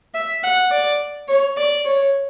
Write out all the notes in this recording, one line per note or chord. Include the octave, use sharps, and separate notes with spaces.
E5
F#5
D5
C#5
D5
C#5